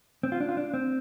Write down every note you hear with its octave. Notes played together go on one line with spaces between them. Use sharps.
C4
F4
D4
F4
D4
C4